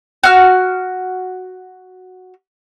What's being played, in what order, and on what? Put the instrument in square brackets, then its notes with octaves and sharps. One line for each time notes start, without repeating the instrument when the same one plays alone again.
[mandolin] F#4 F6